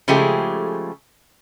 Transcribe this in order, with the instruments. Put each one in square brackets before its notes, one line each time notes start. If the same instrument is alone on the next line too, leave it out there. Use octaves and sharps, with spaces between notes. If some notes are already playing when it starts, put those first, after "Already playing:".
[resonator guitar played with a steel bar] C#3 F3 G#3 A3 G4 G#4